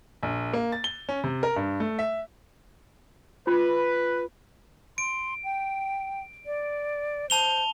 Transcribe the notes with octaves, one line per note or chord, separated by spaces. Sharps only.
A#1
A#3
A6
G7
C#4
C3
A#4
G2
A3
E5
F4 B4
C6 D7
G5
D5
C5 A5 F7 G7